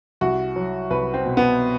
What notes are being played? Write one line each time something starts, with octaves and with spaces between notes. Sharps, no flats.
C2 F#4
F#3
C2 B4
C4
B2
B3